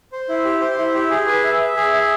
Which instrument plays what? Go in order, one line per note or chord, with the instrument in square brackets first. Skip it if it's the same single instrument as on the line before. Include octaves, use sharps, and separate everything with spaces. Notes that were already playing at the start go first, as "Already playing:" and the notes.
[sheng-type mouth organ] C5
E4
G4
C5
E4
G4
G#4
B4
E5
E5
G#4
E5